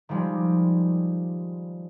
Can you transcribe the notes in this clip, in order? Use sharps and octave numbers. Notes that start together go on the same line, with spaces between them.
D#3 F3 G3 G#3